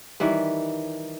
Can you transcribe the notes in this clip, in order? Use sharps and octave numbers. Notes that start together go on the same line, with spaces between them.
D#3 E3 G3 B4